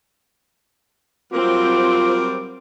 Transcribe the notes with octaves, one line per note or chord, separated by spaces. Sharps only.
F#3 G3 C4 F4 A#4 C5 D6